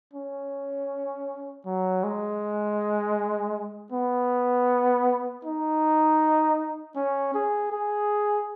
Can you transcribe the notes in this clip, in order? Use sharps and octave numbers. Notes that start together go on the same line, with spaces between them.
C#4
F#3
G#3
B3
D#4
C#4
G#4
G#4